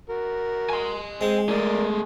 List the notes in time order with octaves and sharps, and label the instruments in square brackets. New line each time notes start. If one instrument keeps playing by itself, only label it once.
[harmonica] F#4 A#4
[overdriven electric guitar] G#5 C6
[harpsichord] G#3 [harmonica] C4
[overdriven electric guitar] A3 G#4 [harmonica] A#4 D5